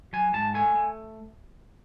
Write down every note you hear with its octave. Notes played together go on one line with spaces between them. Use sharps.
F#3 G#5
G#2 A5
A3 G#5
A3